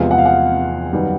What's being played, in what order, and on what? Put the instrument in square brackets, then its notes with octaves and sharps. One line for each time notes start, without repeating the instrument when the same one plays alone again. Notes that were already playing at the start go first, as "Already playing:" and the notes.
Already playing: [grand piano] E2 C3 F3 G#3 B3 [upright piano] F5
[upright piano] F#5
F5
F#5
[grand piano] F#2 D#3 G3 B3